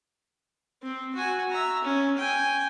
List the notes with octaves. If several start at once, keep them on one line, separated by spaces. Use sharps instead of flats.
C4
F#4 G#5
E5 A#5
C#4
G5 G#5